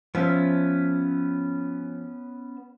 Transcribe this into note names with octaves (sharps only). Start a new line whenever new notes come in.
F3 B3 C#4 E5